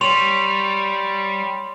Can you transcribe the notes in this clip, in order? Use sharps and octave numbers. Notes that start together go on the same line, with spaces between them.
G3 C#5 C6 F7